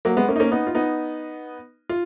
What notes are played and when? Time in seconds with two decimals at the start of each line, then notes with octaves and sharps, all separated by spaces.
0.05 F#3 A#3
0.17 G#3 B3
0.28 A#3 C#4
0.36 D#4
0.40 A#3 C#4
0.51 B3 D#4
0.67 F4
0.75 B3 D#4
1.89 F4